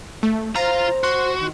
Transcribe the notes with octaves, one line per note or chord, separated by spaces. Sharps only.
A3
F4 C5 F5 A#5
F#4 C6
D#3